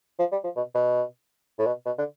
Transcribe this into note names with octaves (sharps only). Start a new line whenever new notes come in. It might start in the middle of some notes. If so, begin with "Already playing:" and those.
F3
G3
F3
B2
B2
A2
B2
B2
D3